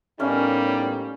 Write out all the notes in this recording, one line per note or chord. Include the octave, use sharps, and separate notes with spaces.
A2 G3 A#3 B3 C#4 D#4